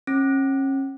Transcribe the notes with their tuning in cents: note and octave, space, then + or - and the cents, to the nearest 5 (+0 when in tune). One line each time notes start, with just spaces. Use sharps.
C#4 -35